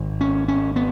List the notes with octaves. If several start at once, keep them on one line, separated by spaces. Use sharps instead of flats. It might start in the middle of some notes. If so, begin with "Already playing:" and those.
Already playing: G#1 G#2
C#4
C#4
B3